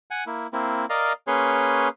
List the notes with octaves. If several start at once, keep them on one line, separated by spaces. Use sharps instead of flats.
F#5 G#5
A#3 E4
A#3 C4 E4
A#4 D5 D#5 F5
A#3 C#4 G#4 B4 C#5 C6